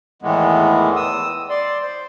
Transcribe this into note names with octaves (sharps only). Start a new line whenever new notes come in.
E2 A2 D#3 E3 G#3 B3
D#6 E6
D5 C6
C5